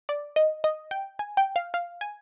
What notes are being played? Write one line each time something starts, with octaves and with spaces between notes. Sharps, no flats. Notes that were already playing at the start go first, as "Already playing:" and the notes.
D5
D#5
D#5
G5
G#5
G5
F5
F5
G#5